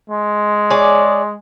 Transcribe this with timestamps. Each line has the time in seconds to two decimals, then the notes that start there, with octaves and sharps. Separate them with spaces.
0.10 G#3
0.70 G#4 C#5 D5